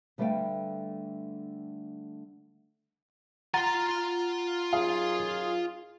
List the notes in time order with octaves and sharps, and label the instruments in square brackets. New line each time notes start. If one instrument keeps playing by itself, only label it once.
[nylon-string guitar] D3 G3 A3 B4 F5 G5
[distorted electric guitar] F4 C6 [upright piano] F#5 [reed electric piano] A#5 A6
[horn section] F#2 D#4 G#4 [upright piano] F5